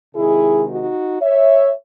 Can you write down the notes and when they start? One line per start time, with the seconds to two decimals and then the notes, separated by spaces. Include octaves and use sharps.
0.14 C3 D#3 G#3 E4 G#4
0.68 D#4 F#4
1.21 C#5 E5